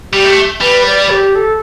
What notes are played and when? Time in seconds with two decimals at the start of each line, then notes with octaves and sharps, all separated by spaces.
0.12 G3 G4
0.25 A3
0.61 G3 B4
0.86 D5
1.10 G4
1.35 A4